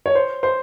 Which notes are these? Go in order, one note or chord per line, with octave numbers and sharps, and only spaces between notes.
C#5
C5
C5